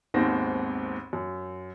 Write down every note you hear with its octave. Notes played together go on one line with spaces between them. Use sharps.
G#1 D#2 G#2 B3 C4 A#6
F#2